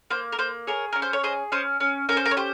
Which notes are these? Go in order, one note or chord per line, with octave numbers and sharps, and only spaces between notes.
A#3 C5
A#4
A#3 C5
G#4 A#4 C#5
C#4 A#4
C5
C#5
G#4 C5 D#5
C#4 C5 D#5
C#4
C#4 A#4
C5
A#4
C#5
G4 C5